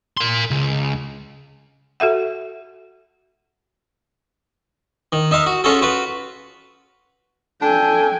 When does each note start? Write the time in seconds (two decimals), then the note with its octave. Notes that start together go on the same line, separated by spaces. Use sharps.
0.17 A#4 C6
0.51 C#2
2.00 F#4 A4 E5 F#5
5.12 D#3
5.31 D#4 E5 F5 C6
5.47 F#4
5.64 C#4 F4 F#4 G#4 A4
5.82 F4 F#4 B4
7.62 D4 A4 G5 G#5